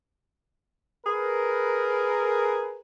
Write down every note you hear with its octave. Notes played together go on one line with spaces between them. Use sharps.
G#4 A#4 B4